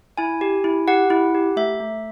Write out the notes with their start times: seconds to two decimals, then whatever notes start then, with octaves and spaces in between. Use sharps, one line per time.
0.17 E4 G#5
0.41 G4
0.64 E4
0.88 G4 F#5
1.10 E4
1.35 G4
1.57 A3 E5
1.80 A3